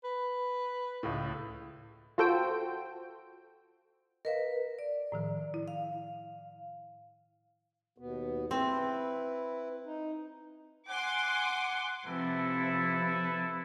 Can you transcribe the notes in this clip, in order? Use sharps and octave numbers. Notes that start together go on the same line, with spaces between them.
B4
C#2 A2
F4 F#4 A4 C5 G5
A#4 B4 D#5 F5
D5
A2 D#3 F3
E4
F5
D#2 B2 B3
C4 E4 B4
D#4
F#5 G#5 C6 D6
C3 F3 E4 A4 B4